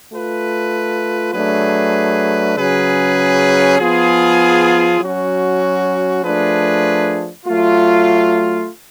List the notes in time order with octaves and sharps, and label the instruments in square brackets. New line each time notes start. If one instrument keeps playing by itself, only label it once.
[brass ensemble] A3 F4 B4
F#3 A3 D4 G#4 B4
C#3 F#3 C#4 G#4 B4
F3 B3 F4 G#4
F#3 C#4 F#4
F3 A3 D4 G#4 B4
F#3 A3 F4